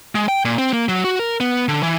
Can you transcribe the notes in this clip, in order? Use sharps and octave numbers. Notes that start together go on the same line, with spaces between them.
G#3
G5
A#2
C4
A#3
F#3
F#4
A#4
B3
D3
E3